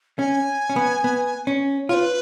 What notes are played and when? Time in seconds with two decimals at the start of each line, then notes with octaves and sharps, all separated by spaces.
0.19 C#4 G#5
0.70 C#4
0.76 B3
1.04 B3
1.47 C#4
1.89 F4 C#5
1.94 B4